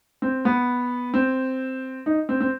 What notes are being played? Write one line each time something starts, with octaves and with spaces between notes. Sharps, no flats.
C4
B3
C4
D#4
C4
C4